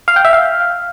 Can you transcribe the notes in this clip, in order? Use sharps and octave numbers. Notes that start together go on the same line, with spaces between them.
F5
G5
E5
F5